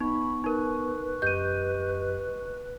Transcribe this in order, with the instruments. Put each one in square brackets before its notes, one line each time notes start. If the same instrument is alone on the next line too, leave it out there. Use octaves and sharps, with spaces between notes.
[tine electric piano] B3 [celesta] D#4 [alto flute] B5 [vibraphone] C#6
[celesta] D#4 A#4 [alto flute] B4
[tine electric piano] F#2 G4 D#5 [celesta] G6 D#7